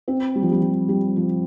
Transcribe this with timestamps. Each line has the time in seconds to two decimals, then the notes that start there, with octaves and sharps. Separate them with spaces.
0.08 C4
0.36 G3
0.43 F3
0.52 G3
0.62 F3
0.89 G3
1.16 F3